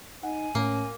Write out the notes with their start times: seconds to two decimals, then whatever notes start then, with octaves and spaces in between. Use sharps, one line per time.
0.23 D#4 F#5 G#5
0.55 A2 A#3 C#4